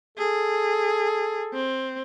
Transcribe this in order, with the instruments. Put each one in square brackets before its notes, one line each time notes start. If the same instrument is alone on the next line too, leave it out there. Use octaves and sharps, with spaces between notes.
[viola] G#4 [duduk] A4
[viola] C4